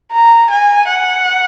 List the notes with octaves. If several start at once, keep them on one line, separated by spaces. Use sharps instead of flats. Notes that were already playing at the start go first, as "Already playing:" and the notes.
A#5
G#5
F#5